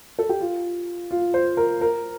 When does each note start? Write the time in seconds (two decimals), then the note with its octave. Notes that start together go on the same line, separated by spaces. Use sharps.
0.19 A4
0.29 G4
0.41 F4
1.11 F4
1.34 C5
1.57 A#4
1.81 A#4